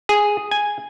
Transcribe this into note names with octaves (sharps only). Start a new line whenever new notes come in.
G#4
G#5